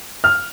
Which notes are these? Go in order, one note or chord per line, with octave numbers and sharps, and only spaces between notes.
F6